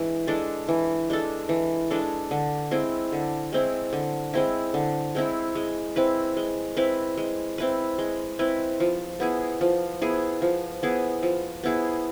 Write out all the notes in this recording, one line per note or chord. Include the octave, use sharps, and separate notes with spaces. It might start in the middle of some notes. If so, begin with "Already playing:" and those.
Already playing: E3 G#3 D4
G#3 D4 A4
E3
G#3 D4 A4
E3
G#3 D4 A4
D3
G#3 C4 E4
D3
G#3 C4 E4
D3
G#3 C4 E4
D3
G#3 C4 E4
G#3
C4 E4 B4
G#3
C4 E4 B4
G#3
C4 E4 B4
G#3
C4 E4 B4
F3
B3 E4 G#4
F3
B3 E4 G#4
F3
B3 E4 G#4
F3
B3 E4 G#4